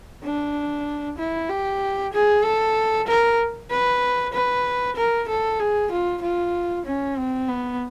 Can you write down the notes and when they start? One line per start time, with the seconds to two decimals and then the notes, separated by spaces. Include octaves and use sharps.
0.23 D4
1.18 E4
1.49 G4
2.13 G#4
2.44 A4
3.08 A#4
3.70 B4
4.33 B4
4.96 A#4
5.28 A4
5.60 G#4
5.91 F4
6.22 F4
6.86 C#4
7.17 C4
7.48 B3